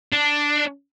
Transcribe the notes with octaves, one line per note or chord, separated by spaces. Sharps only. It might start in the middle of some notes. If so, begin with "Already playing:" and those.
D4